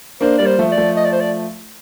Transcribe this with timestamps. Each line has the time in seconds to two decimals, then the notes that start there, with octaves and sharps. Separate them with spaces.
0.21 A#3 D4 C5
0.38 G3 A#3 D5
0.46 C5
0.58 F3 A3
0.72 D5
0.77 F3 A3
0.97 D#5
1.05 D5
1.12 C5
1.21 D5